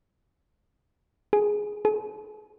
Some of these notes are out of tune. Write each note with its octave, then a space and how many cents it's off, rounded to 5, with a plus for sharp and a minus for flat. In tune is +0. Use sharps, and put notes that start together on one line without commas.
G#4 +5
G#4 +45